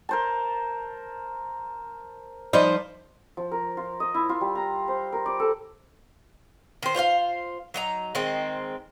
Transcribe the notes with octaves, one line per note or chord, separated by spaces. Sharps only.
A#4 C5 A5
F3 D#4 B4 C5 D5
F3
A#4
F4
D#5
E4
F4
G3
A#5
C5
A#4
D5
A4
D#3 C5
F4 C5 C#5 F5
F#3 D#4 A#5
D#3 G#3 C4 D#5